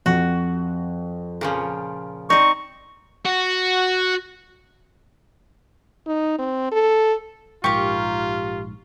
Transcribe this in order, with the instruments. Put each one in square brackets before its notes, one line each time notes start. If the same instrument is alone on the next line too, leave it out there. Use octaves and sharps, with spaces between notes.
[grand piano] F2 [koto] F#4
[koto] A#2 C#3 F3
[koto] C4 D#4 [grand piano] D5 [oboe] C#6
[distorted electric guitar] F#4
[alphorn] D#4
C4
A4
[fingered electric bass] A#1 G#2 [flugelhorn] F4 [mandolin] G4 A#4 [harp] C#6